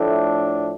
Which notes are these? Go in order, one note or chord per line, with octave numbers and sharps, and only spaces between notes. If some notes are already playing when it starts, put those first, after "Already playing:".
Already playing: A2 F3 A3 D4